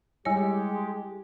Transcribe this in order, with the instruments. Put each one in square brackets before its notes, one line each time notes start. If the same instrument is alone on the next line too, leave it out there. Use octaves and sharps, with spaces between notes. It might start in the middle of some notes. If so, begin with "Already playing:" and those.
[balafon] G3 C#5 [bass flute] G#3 [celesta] E4 G#5 C#7 [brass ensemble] G4